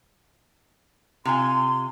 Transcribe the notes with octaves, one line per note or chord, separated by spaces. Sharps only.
C3 F4 G#5 C6